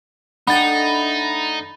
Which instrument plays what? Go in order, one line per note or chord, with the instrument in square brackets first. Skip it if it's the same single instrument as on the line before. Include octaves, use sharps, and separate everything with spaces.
[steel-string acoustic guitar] A3 D4 [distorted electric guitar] D#4 [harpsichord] F#5 G5 [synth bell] B5 A6